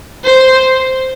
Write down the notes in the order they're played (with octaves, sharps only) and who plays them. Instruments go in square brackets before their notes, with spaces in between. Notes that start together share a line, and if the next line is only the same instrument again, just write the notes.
[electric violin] C5